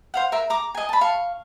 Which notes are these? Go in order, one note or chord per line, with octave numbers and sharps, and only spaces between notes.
C5 F5 F#5
A#4 E5
A#5 D6
D#5 G#5
A5 B5
F5 C#6